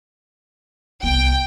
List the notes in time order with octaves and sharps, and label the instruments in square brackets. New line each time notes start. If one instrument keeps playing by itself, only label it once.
[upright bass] C2 B3 [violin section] G5